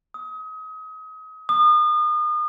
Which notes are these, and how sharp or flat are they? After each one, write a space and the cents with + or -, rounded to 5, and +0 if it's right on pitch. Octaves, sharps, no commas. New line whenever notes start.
D#6 +30
D#6 -35